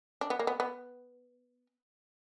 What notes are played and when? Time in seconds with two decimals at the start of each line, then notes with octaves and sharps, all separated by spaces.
0.21 D4
0.30 B3
0.39 A#3
0.47 B3
0.60 B3